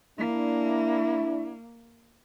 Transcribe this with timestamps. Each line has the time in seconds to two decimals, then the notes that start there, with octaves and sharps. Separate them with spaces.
0.18 A#3 D4 E4